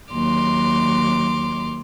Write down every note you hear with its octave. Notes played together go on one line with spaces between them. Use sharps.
D#2 F#3 C6 D6 F6